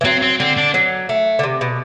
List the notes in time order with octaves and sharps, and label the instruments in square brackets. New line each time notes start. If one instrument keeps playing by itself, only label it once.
[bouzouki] E3
[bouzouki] F#3 [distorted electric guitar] C4
[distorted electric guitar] C4
[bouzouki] D3 [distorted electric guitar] C4
[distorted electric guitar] D4
[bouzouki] F#3
A3
D3
C3
B2